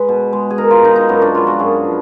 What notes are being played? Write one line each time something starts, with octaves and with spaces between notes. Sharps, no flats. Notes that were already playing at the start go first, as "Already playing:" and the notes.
Already playing: G#3 B4
B2
G#3
G#4
B2 A#4
F4
G#3 D#4
D#4
F#2 B3
D4
F3 G#3 F4
F#4
F#2 G#4
F3